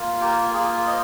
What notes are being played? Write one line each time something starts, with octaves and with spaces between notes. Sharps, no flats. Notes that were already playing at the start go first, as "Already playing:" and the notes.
Already playing: A#3 F4
G4 A#4
A#3 F4 G#4
C5 D#5